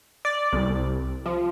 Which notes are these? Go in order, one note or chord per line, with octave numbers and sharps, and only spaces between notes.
D5
C2
F3